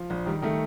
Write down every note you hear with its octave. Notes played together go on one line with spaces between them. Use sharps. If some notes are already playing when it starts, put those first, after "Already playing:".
Already playing: F3
A#1
D#3 G3
D#3 A3